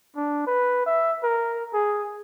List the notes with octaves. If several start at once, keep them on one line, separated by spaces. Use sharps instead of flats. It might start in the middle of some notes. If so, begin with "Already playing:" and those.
D4
B4
E5
A#4
G#4